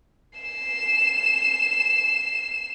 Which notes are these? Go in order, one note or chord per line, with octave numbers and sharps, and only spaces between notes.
C7 E7